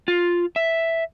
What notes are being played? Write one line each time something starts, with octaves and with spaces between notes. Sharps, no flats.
F4
E5